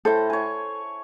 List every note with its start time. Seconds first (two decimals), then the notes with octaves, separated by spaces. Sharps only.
0.05 A2 A4 C5
0.30 C#5 G#5